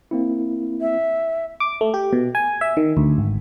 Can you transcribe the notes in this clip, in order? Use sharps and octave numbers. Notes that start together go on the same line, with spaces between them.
A#3 C4 E4
E5
D6
A3
G4
B2
G#5
E5
D#3
D2
G#1